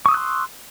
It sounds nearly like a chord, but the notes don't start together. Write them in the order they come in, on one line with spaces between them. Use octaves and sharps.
C#6 D#6 E6 F#6 C6